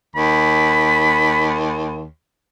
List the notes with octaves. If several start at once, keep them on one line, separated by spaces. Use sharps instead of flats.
D#2 B5